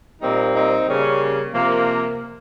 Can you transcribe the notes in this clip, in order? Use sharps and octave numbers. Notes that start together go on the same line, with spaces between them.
A#2 G3 A#3 C4 D#4
C4 D#4
C#3 G3 A#3 C#4
C3 F3 A#3